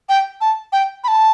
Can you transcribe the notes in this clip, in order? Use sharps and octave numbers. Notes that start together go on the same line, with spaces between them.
G5
A5
G5
B5
A5